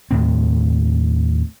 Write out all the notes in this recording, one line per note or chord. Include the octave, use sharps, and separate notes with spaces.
D#2 A2 C4